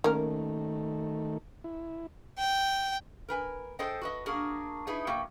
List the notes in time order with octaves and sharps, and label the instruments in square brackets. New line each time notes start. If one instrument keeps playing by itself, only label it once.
[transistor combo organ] D#3 A3 [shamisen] A#3 C#4 A#4
[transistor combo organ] E4
[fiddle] G5
[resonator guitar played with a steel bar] A#4 B4 G#5
G#4 A4 C5 D#5 G5
F#4 B4 D#5
A#3 D4 F#4 G#4 A#4
D#4 E4 G#4 B4
B2 A#3 F#4 E5 G5